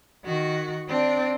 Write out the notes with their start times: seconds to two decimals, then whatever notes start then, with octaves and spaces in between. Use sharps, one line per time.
0.24 D#3 F#4
0.88 C4 D4